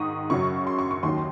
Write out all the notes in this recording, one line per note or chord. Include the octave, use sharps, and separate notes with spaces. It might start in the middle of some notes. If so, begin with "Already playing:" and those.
Already playing: G#2 D#3 C#6 D#6
F#2 C#3 F#3 C#6
C6
C#6
C#6
D#2 D#3 F#3 C6